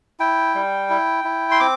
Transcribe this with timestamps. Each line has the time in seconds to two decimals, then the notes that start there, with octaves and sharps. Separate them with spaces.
0.20 E4 G5
0.55 G3
0.90 E4
1.25 E4
1.51 C6
1.60 C4 D6